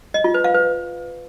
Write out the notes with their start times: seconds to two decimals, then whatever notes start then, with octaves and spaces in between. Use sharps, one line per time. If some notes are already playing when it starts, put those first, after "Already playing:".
0.14 D#5
0.24 F4
0.34 B4
0.44 F5
0.54 B4